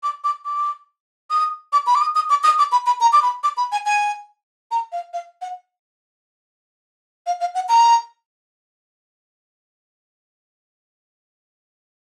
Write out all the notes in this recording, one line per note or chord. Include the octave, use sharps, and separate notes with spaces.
D6
D6
D6
D#6
D6
B5
D6
D#6
D#6
D6
D#6
D6
B5
B5
A#5
D6
B5
D6
B5
G#5
G#5
A#5
F5
F5
F#5
F5
F5
F#5
A#5